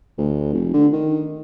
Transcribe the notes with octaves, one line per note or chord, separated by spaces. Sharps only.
D2
F1
D3
D#3